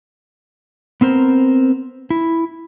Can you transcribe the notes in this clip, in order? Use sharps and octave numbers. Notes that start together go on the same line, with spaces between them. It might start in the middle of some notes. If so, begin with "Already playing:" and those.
B3 C4 A#4 C5
E4